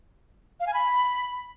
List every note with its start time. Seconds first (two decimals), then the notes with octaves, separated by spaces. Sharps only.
0.60 F5
0.67 G#5
0.74 B5